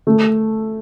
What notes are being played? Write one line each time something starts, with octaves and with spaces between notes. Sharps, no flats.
A3